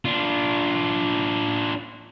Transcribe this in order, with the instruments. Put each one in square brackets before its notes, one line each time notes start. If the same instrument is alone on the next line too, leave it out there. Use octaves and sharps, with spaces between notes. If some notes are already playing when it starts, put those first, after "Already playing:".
[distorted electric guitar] D4 F4